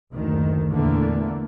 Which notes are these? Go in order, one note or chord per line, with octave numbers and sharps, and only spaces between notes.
F#1 D2 D#3
E2 A#2 D3 E3 A3 A#3